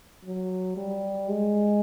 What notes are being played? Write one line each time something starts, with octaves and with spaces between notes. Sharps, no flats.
F#3
G3
G#3